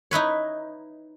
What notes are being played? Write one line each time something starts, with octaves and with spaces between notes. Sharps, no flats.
D#4 E4 B4 C#5